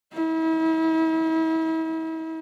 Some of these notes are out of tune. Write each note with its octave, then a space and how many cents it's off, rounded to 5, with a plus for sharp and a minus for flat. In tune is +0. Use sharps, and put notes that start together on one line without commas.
E4 -40